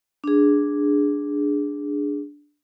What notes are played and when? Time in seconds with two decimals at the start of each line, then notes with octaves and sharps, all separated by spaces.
0.24 D4 G#4